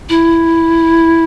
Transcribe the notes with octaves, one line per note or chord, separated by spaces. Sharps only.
E4